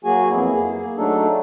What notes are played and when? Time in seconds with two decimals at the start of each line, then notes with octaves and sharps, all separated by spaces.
0.04 F#3 A#3 F#4 G#4 G#5
0.30 F2 B3 E4
0.52 A#3 G#4
0.97 F#3 A3 D4 D#4 A4